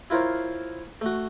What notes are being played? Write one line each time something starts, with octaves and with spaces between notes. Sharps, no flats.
E4 F4 A#4 C5 C#5
A3 F#4